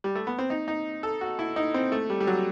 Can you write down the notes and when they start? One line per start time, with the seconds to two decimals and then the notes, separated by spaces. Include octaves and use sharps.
0.04 G3
0.15 A3
0.27 B3
0.38 C4
0.50 D#4
0.68 D#4
1.03 A4
1.21 F#4
1.39 E4
1.56 D#4
1.74 C4
1.92 A3
2.10 G3
2.20 G3
2.27 F#3